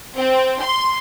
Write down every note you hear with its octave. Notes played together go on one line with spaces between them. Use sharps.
C4
C6